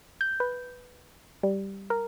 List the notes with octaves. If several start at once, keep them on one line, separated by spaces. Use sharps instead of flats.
G6
B4
G3
A#4